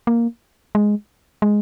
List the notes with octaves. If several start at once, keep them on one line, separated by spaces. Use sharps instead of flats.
A#3
G#3
G#3